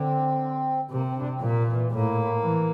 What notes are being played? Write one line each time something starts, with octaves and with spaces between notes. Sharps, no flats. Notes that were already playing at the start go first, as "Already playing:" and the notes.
Already playing: D3 C4
C3 A#3
C4
D4
C4
A#2 A#3
E3
A2 A#3
E3